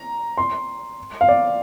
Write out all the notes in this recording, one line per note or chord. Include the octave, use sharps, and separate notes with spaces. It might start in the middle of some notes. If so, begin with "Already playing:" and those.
Already playing: A#5
C6
F5
D5